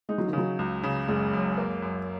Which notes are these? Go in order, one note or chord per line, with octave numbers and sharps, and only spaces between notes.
G#3 D#4
F#3
D#3
C#3 F#3
C#2
C#3
F#1 G#3
F#2
A#3
F#2